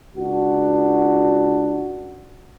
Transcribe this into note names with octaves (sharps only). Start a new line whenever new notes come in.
C#2 D4 F#4